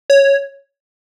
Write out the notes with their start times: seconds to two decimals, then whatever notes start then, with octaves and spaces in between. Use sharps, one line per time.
0.10 C#5